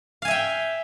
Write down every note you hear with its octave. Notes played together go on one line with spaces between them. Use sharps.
E5 F5 G5 G#5